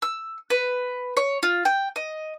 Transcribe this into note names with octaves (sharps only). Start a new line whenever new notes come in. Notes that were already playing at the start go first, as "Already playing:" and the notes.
E6
B4
C#5
F4
G5
D#5